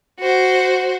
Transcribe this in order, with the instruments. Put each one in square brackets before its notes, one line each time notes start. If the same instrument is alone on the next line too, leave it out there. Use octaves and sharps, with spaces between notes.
[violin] F#4 C5